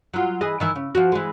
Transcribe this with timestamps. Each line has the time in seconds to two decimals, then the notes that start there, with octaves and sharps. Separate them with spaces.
0.13 F#3 F4
0.41 E3 G#4 D#5
0.60 D#3 E3 E4
0.76 C#3
0.95 F3 F#4
1.12 E3 G#3